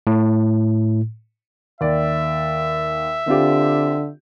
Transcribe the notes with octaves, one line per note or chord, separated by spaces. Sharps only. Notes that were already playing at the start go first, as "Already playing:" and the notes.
A2
D#2 D5 E5
D3 C4 F4 G4